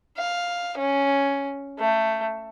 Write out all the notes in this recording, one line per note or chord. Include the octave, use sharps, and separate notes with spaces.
F5
C#4
A3